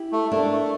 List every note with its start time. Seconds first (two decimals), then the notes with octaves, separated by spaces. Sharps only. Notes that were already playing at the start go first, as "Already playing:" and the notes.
Already playing: E4 G4
0.12 A3
0.31 A3 A#3 D4
0.51 A3